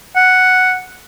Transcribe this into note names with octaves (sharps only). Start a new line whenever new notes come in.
F#5